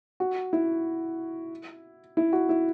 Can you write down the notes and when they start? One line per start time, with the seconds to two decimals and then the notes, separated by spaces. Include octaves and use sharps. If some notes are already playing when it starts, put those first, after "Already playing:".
0.20 F#4
0.53 E4
2.17 E4
2.33 F#4
2.49 E4